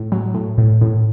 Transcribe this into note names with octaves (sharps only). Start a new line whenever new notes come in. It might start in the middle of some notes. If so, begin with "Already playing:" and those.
Already playing: A2
F#3
A2
A2
A2